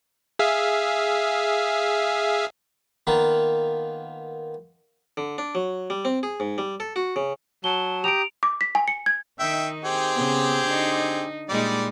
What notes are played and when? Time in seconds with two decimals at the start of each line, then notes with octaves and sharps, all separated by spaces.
0.39 G#4 E5 F5
3.07 D#3 A#3 B3 F4 A#4 B4
5.17 D3
5.38 D4
5.55 F#3
5.90 G3
6.05 C4
6.23 G#4
6.40 G#2
6.58 G3
6.80 A4
6.96 F#4
7.16 C#3
7.64 F#3 A5 G7
8.04 G4 A#5 D#6 D7 F7
8.43 D6
8.61 B6
8.75 G#5
8.88 C#7
9.06 G#6
9.40 D#3 D#4 E5 G5
9.85 C4 G4 G#4
10.14 C#3 B3
10.67 D3 D#4
11.49 A#2 G3 G#3 D#4 D5